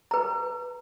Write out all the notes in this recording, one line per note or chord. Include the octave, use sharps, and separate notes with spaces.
B4 A#5